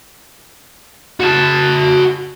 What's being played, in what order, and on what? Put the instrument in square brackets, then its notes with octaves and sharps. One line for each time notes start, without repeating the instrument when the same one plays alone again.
[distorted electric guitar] F#4 A5